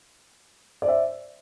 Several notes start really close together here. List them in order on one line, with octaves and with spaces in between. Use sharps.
D5 C5 E5